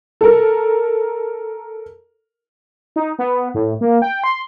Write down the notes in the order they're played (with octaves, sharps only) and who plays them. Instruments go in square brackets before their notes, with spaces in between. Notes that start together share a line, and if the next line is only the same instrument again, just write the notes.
[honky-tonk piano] A4 A#4
[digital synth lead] D#4
B3
A2
A#3
G5
C6